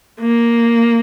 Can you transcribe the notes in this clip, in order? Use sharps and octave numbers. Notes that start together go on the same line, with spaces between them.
A#3